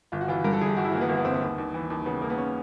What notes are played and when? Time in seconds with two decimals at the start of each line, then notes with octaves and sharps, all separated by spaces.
0.12 G1 F4
0.21 F#4
0.28 E3 F4
0.44 G2 A#4
0.53 A4
0.61 G1 G#4
0.69 G4
0.76 G1 F#4
0.85 E4
0.93 E3 A#3
1.01 B3
1.09 G1 A#3
1.18 B3
1.25 G1 C4
1.33 B3
1.42 D#2
1.58 D#2
1.74 E3
1.90 D#2
2.06 C#3 B3
2.22 D#2 A#3
2.30 B3
2.38 C#4